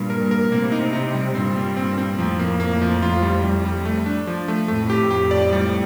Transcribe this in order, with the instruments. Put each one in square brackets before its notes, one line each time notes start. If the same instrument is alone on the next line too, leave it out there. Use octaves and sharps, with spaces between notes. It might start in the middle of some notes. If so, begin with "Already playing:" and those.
Already playing: [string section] G2 A#2
[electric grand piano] A#4
A#4
[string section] A2 C3 [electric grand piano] A#3
[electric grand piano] D#4
D#4
G3
[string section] G2 A#2 [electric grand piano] C4
[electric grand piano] G3
C4
C4
[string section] F2 A2 [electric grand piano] F3
[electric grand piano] A#3
A#3
F3
F4
G3
G3
G3
A3
D4
F3
A3
[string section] F2 A2 [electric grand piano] A3
[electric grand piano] G4
G4
D5
G3